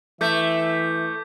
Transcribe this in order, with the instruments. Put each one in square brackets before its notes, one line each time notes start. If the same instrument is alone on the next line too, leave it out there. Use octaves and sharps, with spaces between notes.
[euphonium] E3 [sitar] A3 [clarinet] E5 [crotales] D6 G6 B6